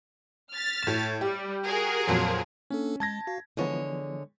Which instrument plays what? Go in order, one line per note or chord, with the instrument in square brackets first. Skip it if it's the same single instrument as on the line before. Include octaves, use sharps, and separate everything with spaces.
[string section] F6 A6 B6
[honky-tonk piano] A2 E7
[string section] G3 [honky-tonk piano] G4
[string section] F#4 G#4 A#4
[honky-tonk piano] F2 A#2 F#3
[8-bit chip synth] A#3 D4 A4 [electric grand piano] C#4
[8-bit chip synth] G#3 [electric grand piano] A5 G#6 A#6
[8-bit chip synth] F#4 F5
[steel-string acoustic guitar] D3 G#3 C#5 [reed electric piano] E3 F3 B3